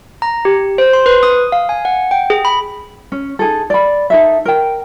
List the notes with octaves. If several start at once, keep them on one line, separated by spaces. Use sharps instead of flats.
A#5
G4
C5
C6
B4
D#6
F5
G#5
F#5
G5
G#4
B5
C#4
D#4 G#4 A4
D5 B5
D#4 A4 E5
A#4 G5